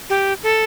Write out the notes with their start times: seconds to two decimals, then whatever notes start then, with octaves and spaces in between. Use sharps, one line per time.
0.10 G4
0.43 A4